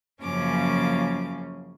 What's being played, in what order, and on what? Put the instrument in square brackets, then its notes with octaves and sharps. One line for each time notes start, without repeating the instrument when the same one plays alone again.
[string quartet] F#2 C#3 F3 A#3 C#4 D6